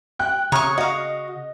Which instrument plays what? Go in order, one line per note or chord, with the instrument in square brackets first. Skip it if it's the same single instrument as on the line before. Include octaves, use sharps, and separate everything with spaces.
[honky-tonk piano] G5 F#6
[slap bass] C#3 [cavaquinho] C#5 C#6 [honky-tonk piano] A#5 D#6 F6
[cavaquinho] F#4 F5 [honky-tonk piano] D#5